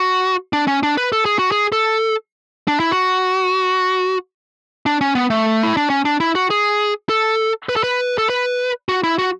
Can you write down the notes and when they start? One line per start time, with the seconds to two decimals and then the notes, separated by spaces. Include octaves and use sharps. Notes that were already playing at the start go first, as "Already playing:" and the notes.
Already playing: F#4
0.53 D4
0.67 C#4
0.83 D4
0.97 B4
1.12 A4
1.25 G#4
1.39 F#4
1.52 G#4
1.72 A4
2.68 D4
2.80 E4
2.92 F#4
4.86 D4
5.01 C#4
5.15 B3
5.30 A3
5.63 E4
5.77 D4
5.90 C#4
6.05 D4
6.20 E4
6.35 F#4
6.50 G#4
7.09 A4
7.69 B4
7.76 A4
7.84 B4
8.18 A4
8.29 B4
8.89 F#4
9.04 E4
9.19 F#4